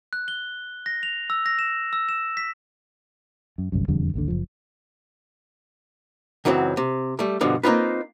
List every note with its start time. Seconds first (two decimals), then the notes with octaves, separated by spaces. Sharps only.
0.13 F#6
0.28 G7
0.86 A#6
1.03 F7
1.30 E6
1.46 A#6
1.59 E7
1.93 E6
2.09 E7
2.37 B6
3.58 F#2
3.72 G1 C2 F#2
3.88 E1 F2 D3 G3
4.14 A1 D#2 D3
4.28 F#1 F3
6.45 C#2 F#2 E3 F#3 C4
6.77 C3
7.19 G3 A3
7.41 G2 B2 D3 F3
7.63 A#3 C4 D#4 F4 B4